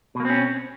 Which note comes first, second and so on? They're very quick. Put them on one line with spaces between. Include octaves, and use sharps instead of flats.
B2 A#3 C4 C#4